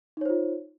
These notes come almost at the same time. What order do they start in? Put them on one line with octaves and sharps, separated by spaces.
D#4 C#5 C5 F4